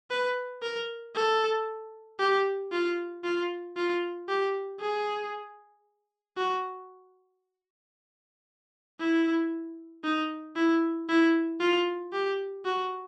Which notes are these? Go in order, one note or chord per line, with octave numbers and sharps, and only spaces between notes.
B4
A#4
A4
G4
F4
F4
F4
G4
G#4
F#4
E4
D#4
E4
E4
F4
G4
F#4